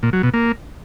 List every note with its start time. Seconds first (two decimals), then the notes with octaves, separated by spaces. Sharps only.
0.03 A#2
0.13 F#3
0.23 B2
0.34 A#3